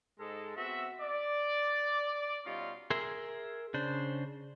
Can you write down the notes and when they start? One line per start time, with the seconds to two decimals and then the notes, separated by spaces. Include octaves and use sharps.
0.20 G#2 G#3 A4
0.56 B3 C4 F#4 E5
1.00 D5
2.46 B2 G3 C#4 D#4 F4
2.90 G#4 A#4 E5 C6
3.74 C#3 D4 C5